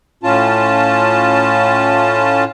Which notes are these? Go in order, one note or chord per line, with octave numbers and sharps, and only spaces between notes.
A2 C#4 F4 A5